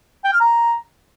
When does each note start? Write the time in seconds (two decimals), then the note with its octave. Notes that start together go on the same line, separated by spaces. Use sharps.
0.24 G5
0.32 F6
0.40 A#5